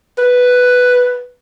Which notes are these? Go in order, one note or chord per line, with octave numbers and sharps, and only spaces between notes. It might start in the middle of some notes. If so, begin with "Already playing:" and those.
B4